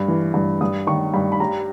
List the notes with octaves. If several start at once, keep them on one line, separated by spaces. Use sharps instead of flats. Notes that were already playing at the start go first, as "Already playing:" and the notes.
Already playing: G2
E3
G2
G2 D#6
D#3 C#6
G2 B5
B5
G3 A#5